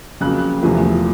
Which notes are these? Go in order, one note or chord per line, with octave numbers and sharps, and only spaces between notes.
F2 C#3 F#3 A#3 F#6
E2 C3 F3 A3 C4